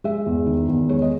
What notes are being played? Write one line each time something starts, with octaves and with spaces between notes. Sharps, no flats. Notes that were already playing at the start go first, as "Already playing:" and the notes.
G#3 E5
E2
D#3
E2
G#3 C#5
D#5